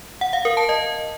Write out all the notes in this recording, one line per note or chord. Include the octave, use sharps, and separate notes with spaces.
F#5
F5
A#4
A5
D#5